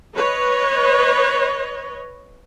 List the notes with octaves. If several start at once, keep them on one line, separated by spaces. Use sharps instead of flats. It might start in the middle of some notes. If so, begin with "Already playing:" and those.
B4 C#5 D#5